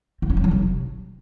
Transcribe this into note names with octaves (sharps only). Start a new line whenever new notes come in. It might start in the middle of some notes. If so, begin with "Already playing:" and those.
C4
C#4
F3
F#3
C3